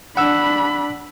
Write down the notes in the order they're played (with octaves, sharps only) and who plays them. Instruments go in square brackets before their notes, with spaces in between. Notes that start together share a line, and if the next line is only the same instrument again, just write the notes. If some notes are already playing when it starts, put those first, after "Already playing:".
[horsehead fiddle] D4 B5 [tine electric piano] F#5 E6